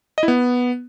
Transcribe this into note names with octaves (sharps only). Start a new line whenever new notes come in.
D#5
E4
B3